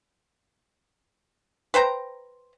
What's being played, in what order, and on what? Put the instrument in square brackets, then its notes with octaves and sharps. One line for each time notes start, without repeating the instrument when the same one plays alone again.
[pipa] B4 C5 G5 A#5